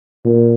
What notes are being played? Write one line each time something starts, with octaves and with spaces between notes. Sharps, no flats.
A#2